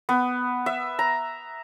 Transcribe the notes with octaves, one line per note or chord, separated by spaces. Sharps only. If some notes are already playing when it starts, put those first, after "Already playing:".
B3
E5
A#5